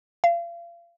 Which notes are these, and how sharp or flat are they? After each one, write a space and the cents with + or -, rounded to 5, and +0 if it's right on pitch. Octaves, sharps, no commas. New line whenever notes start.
F5 -35